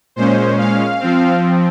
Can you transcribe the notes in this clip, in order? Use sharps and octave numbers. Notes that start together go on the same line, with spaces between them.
A#2 G#3 C#4 C5
F5
F3 C4